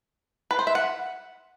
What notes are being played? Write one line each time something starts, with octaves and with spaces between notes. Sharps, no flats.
B4
C5
E5
F#5